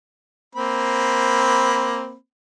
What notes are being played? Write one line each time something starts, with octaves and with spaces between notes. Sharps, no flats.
A#3 C4 B5